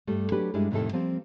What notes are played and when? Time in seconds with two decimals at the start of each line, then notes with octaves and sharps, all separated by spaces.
0.07 G2 G3 A3
0.32 F#3 D4 G4 B4
0.54 G2 G3 G#3 D4 E4
0.71 F2 A2 C3 D#3 A#3 A4
0.93 F3 G3 A#3 C4